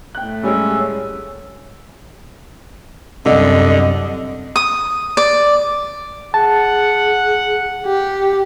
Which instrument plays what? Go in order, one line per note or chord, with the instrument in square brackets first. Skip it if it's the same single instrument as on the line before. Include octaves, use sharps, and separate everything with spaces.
[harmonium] A2 [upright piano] G5 F#6
[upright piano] G3 G#3 [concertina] C#4 [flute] E6
[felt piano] C2 [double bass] F#2 [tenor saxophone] D3 [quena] D#5
[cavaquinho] D#6
D5
[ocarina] G#4 [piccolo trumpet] F#5 [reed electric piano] A5
[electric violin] G4